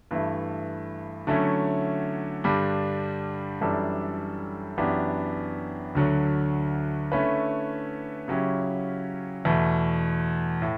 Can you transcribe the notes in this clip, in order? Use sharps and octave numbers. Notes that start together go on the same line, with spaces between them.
G2 E3 A3
D3 F#3 A3 C#4 E4
G2 D3 G3 D4
F#2 E3 G3 D4 A4
F#2 E3 B3 D4 G4
D2 D3 F#3
D3 A3 C#4 E4 B4
C#3 F#3 C#4 E4 G4
E2 B2 A3
A2